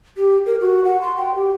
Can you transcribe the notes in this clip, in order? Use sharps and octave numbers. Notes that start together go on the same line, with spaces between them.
G4
A#4
F#4
F#5
C6
G5
G4